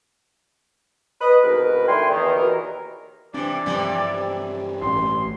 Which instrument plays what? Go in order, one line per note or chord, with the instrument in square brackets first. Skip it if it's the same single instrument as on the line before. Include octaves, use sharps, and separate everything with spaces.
[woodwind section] B4 D#5
C2 G#2 B2 A#4 B4
D#3 A3 D4 G5 G#5 C6
E2 D#3
D#2 B2 E3 A#4
[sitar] C3 E3 [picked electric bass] D4 [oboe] D5
[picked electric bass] G2 F3 [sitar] C3 E3 G3
[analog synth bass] A1 [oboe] C6